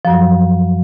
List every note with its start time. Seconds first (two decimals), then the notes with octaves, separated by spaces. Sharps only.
0.05 F3
0.07 F#2
0.10 F#3